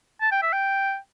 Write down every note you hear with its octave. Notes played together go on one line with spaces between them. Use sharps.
A5
G5
E5
G5